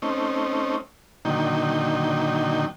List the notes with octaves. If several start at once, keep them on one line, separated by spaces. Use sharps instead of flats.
A3 C4 C#4 D#4
A#2 D3 D#3 F#3 D#4 G5